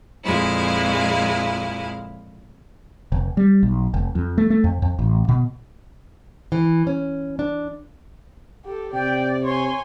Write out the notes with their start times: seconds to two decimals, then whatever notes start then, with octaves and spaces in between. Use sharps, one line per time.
0.24 F2 A#2 G#3 E4 F5
3.12 F1
3.37 G3
3.63 B1
3.94 F1
4.15 F2
4.38 A3
4.50 A3
4.64 F2
4.82 F2
4.99 A1
5.29 B2
6.52 E3
6.87 C#4
7.39 D4
8.65 G4 A4
8.93 C3 D5 G5
9.45 C#5 G#5 C6